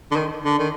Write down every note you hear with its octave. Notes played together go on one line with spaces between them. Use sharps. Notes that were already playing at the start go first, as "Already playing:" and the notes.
D3
D#3
D3
D#3